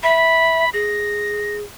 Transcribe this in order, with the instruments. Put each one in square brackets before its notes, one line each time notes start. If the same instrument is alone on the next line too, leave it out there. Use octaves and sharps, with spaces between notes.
[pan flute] E5 [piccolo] B5
[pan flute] G#4 [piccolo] A#6